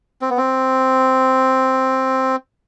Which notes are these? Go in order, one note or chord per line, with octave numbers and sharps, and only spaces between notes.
C4
B3
C4